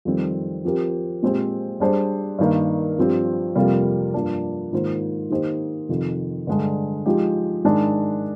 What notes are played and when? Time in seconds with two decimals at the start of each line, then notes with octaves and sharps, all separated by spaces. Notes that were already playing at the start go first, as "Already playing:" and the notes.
0.05 F2 D#3 G3 C4
0.65 F3 C4 G4 A#4
1.23 A#2 G#3 C4 G4 C5
1.80 G3 D4 G#4 C5
2.39 G2 D#3 A#3
2.98 G2 F3 C4 G4
3.55 F2 C3 G3 A#3 F4
4.14 G2 F3 A#3 D4
4.73 G#2 D#3 A#3 F4 C5
5.30 D#3 A#3 D#4 G4 C5
5.89 F2 C3 D#3
6.47 G2 D3 G#3 D4
7.06 F3 G#3 D#4 G4
7.64 G#2 D#3 G#3 D4